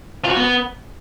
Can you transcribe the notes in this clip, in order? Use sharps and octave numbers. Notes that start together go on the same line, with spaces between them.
F4
F#4
B3